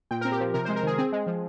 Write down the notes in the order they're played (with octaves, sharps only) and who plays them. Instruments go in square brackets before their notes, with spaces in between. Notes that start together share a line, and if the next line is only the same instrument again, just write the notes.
[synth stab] A#2 G5
C4 A#4
G4
F3
C3 A#4
G#3 C5
A#4
D#3 G#4
C4 G#4
G#3
F3